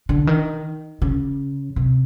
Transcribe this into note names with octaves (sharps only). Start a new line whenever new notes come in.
D3
D#3
C#3
C3